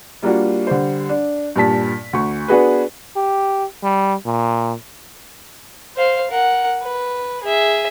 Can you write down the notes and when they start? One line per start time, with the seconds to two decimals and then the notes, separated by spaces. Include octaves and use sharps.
0.23 G3 A#3 D4 F4 F#4
0.67 D3 G3 C5
1.09 D4
1.56 G2 A#2 A5 B6
2.13 D2 C#6
2.48 B3 D4 F#4 G#4 B4
3.16 G4
3.83 G3
4.25 A#2
5.97 C5 F5
6.31 A#4 F#5
6.82 B4
7.43 G#4 E5